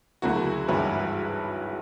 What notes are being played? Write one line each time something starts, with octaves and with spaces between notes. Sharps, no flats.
D2 C#3 F#3 A#3 E4 F#4
G#1 G2 E3 B4 C#5